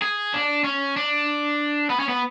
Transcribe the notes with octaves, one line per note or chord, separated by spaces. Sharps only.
G#4
D4
C#4
D4
B3
C#4
B3